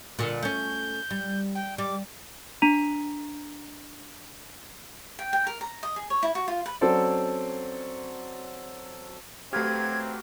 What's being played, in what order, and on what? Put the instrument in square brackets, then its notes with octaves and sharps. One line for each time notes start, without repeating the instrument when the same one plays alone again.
[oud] A#2 D3
[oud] A3 C#4 [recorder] G6
[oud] G3
[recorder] G5
[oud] G3 [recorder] D6
[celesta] D4 A#5 B6 D#7 F7
[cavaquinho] G5
G5
A#4
A#5
D#5
G#4
C#5
E4
F#4
F4
B4
[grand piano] F#3 C4 C#4 A4 C5 D5
[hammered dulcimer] F#3 B4 F5 [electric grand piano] A3 G4 [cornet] C4 [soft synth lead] G#6